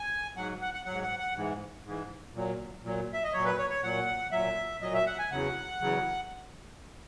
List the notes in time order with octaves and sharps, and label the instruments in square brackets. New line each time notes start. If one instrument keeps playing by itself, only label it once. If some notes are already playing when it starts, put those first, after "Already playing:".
Already playing: [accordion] G#5
G#2 F#3 F#5
F#5
F#5
G#2 F#3 F#5
F#5
F#5
G#2 E3
G#2 E3
A#2 F#3
A#2 F#3
E5
D#5
A#2 F#3 C#5
B4
C#5
C#5
A#2 F#3 F#5
A#2 F#3 E5
A#2 F#3 D#5
E5
F#5
G#5
E2 C#3 F#3 F#5
E2 C#3 F#3